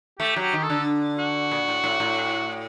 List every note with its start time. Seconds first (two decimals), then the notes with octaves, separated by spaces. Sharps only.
0.19 A3 G4
0.36 F#3
0.42 G4
0.53 D#3
0.63 A4
0.70 D3
1.18 F#4
1.51 A#2
1.68 A2
1.84 A2
2.00 A2